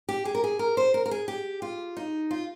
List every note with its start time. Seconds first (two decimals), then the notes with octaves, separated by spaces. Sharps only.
0.09 G4
0.25 G#4
0.35 A#4
0.44 G#4
0.59 A#4
0.77 C5
0.94 A#4
1.06 A#4
1.11 G#4
1.28 G4
1.62 F4
1.97 D#4
2.31 F4